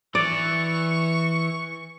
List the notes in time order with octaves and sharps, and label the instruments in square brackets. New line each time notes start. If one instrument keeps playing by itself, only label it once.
[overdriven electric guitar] E3 [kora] D5 [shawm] C#6